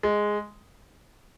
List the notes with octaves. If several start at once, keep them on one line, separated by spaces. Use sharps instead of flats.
G#3